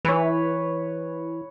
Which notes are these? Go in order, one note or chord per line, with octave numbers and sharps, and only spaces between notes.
E3 B4 C#5